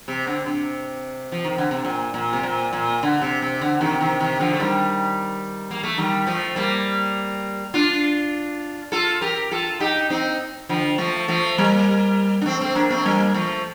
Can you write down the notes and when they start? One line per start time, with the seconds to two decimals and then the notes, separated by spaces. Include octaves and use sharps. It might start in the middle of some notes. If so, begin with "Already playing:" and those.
0.08 C3
0.27 D3
0.46 C3
1.32 F3
1.44 D#3
1.58 D3
1.71 C3
1.85 A#2
2.14 A#2
2.33 C3
2.43 A#2
2.73 A#2
3.03 D3
3.22 C3
3.42 C3
3.61 D3
3.81 C3 D#3
4.01 C3 D#3
4.20 C3 D#3
4.40 D3 F3
4.53 A3
4.60 D#3 G3
5.71 A#3
5.84 A3
5.98 D#3 G3
6.27 F3 A3
6.56 G3 A#3
7.74 D4 F4
8.92 F4 A4
9.21 G4 A#4
9.51 F4 A4
9.80 D#4 G4
10.10 C4 D#4
10.69 D3 F3
10.98 F3 A3
11.28 F3 A3
11.58 G3 A#3
12.41 D4
12.46 A3 C4
12.61 A3 C4
12.75 A#3 D4
12.90 A3 C4
13.06 G3 A#3
13.34 F3 A3